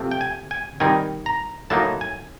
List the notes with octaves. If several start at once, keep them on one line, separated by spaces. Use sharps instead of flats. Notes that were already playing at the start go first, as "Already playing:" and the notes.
Already playing: C3 F3 A3 C4
G5
G#5
G#5
D#3 G3 C4 D#4 G#5
A#5
A2 F#3 A#3 D#4 A5
G#5